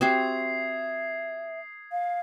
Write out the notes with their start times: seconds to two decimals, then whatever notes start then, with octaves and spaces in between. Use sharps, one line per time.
0.01 C4 F#4 G4 E5 D#6 G#6 C7
1.92 F5